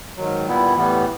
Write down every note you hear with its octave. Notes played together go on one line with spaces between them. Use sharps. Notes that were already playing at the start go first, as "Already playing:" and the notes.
G#2 D#3 F#3
A#2 G3 B3 E4
A2 E3 G3 B3